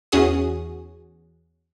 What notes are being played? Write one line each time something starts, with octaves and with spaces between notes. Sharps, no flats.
E2 C#4 F#4 G#4 D#6